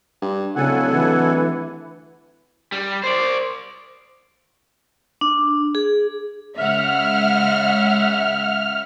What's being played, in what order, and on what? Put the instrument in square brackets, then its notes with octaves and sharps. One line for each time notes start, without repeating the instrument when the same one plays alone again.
[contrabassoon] G2
[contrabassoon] D1 [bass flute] C#3 [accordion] A4 F#5 G#5
[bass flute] E3
[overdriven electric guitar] G3
C5 D5
[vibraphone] D4
G#4
[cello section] C#3 G#3 [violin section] E5 F#5 [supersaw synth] F6